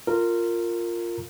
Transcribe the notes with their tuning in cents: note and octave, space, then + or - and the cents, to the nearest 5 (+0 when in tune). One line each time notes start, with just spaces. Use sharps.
F4 +0 A#4 -15